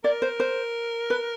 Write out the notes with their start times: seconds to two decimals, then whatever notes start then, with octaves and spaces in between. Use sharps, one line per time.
0.04 A#4 D5
0.22 C5
0.40 C5
1.10 B4